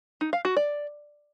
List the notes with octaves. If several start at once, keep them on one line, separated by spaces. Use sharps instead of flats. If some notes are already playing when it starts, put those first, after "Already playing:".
D#4
F5
F#4
D5